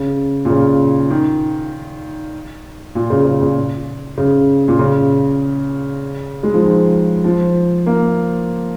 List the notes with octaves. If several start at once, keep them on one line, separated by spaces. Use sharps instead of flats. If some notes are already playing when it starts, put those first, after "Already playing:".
Already playing: C#3
A#2
C#3
D#3
A#2
C#3
C#3
A#2
C#3
A#2
C#3
G#3
F3
D#3
F3
A#3